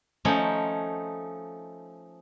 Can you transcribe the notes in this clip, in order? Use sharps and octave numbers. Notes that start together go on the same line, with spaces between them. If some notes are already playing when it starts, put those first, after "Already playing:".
F3 A3 C#4 D#4 C5 C#5